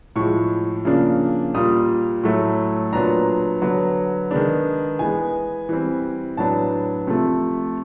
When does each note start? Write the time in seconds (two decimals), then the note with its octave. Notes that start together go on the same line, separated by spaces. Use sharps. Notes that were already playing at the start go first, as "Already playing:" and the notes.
0.16 A2 F3 G#3 C#6
0.85 C#3 F3 A#3 D4
1.54 A#2 G3 A#3 D#6
2.23 A2 F#3 A3
2.93 A#2 F#3 B3 D4 A#5
3.62 D3 F#3 B3
4.31 D#3 G#3 B3 D4
4.99 E3 G#3 B3 G#5
5.69 E3 G3 C4
6.37 A2 F#3 B3 D4 A5
7.07 C3 F3 A3